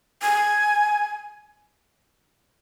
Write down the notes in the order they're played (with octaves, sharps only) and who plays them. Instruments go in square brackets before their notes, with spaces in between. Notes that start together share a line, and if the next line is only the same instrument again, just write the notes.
[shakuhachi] G#5